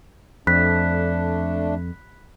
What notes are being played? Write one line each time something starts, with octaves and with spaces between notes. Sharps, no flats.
F2 A3 D4 B5 F#6 B6